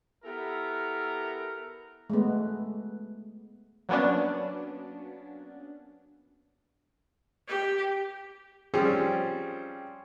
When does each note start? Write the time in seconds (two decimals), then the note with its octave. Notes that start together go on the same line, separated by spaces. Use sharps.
0.24 B3 E4 G4 A4 A#4
2.10 G#3 A3 B3
3.89 F#3 A#3 B3 C#4 D4
7.48 G4
8.74 F3 G3 C4 C#4 G4 G#4